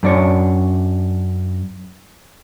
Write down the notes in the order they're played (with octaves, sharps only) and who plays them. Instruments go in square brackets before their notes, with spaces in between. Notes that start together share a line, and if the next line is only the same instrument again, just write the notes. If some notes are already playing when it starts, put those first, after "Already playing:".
[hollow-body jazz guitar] F#2 D4 C#5